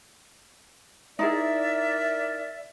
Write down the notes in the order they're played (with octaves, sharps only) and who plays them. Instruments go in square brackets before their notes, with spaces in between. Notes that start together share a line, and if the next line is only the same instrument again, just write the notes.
[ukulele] D#4 E4 G#4 [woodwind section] A#4 D5 [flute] E5